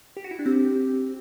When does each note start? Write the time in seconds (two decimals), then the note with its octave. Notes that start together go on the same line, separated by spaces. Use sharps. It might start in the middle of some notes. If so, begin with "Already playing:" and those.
0.17 G4
0.24 F#4
0.31 E4
0.39 D4
0.46 C4 G4